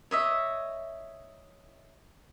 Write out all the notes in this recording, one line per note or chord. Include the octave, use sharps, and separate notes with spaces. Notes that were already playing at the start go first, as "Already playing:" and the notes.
C#5 D#5 E5